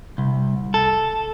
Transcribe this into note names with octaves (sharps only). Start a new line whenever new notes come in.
C2
A4